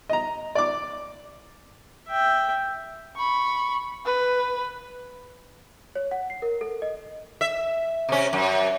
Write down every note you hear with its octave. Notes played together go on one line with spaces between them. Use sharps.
D#5 A#5
D5 D6
E5 G5
B5 C#6
B4
C#5
F#5
C7
A#4
A4
D#5
E5
C3 C#4
F#2